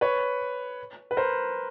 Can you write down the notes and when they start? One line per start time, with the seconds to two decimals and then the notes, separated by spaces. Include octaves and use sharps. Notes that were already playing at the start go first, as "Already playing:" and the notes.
0.01 B4 C#5
1.11 B4
1.17 A#4 C5